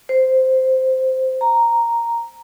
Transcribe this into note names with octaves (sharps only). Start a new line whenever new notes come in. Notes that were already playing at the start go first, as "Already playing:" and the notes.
C5
A#5